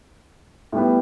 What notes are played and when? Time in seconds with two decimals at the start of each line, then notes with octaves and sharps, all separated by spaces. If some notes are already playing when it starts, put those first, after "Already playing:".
0.72 A2 G3 B3